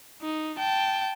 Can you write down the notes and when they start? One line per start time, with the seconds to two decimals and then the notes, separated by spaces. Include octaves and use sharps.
0.22 D#4
0.58 G5 A5